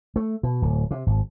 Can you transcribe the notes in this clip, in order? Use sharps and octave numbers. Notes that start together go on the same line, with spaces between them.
A3
B2
D1
C3
G#1